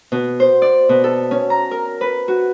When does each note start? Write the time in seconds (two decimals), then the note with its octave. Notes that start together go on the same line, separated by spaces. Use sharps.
0.12 B2
0.40 C5
0.62 D5
0.89 B2
1.04 A4
1.31 C#4
1.50 A#5
1.71 A#4
2.01 B4
2.28 F#4